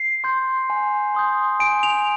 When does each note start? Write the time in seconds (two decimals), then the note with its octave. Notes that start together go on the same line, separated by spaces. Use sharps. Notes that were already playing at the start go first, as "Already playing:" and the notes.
Already playing: C7
0.24 C6 G6
0.70 G#5
1.15 C6 D#6 G6
1.60 G#5 D7
1.83 F7